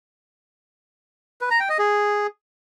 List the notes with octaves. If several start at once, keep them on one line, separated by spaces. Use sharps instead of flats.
B4
A#5
G5
D#5
G#4